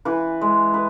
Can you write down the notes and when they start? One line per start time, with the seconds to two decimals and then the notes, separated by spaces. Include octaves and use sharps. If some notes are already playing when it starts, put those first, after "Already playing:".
0.05 E3 B4
0.41 G#3
0.74 B4